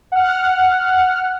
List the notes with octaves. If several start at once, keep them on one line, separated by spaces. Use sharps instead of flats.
F#5 F6